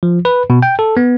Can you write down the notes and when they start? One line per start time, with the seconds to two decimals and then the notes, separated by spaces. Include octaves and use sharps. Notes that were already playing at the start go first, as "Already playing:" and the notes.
0.03 F3
0.25 B4
0.50 B2
0.63 G5
0.79 A4
0.97 B3